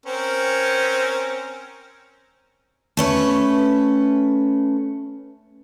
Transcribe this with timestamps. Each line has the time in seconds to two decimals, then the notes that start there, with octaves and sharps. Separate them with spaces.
0.06 C4 C#4 A#4
2.97 A3 C#4 B4